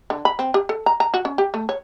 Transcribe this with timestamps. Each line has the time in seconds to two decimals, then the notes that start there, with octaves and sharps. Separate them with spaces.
0.10 D3
0.25 B5
0.39 C4
0.54 G4
0.69 A4
0.86 A#5
1.00 A#5
1.14 F#4
1.25 C#4
1.38 G4
1.54 A3
1.69 C#5